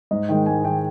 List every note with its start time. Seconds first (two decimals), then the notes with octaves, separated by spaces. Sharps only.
0.11 G#2 D#5
0.29 D#3 G#3 G5
0.46 G#2 G#5
0.64 D#3 G#3 G5